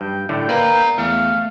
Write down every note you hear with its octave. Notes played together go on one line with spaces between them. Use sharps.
G2 G5
A2 D3 A3 G5
A#3 B4 D5 A#5
E2 A3 F5